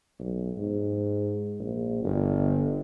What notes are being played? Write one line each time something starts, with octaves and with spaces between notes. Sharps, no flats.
B1
G#2
A#1
G1